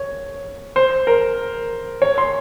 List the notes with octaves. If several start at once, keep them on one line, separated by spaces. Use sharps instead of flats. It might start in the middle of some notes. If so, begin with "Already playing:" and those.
Already playing: C#5
C5
A#4
C#5
C6